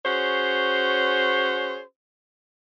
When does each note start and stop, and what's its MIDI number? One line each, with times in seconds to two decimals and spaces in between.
0.05 1.80 61
0.05 1.80 66
0.05 1.80 68
0.05 1.80 72
0.05 1.80 73